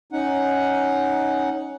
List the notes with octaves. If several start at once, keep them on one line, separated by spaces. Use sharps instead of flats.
C#4 D#4 F#5